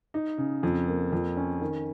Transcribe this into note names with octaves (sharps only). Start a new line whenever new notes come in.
D#4
C#3
F2
A#3
F2
C#4
D#3